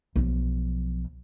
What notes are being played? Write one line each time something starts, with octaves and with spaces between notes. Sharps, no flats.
B1 F3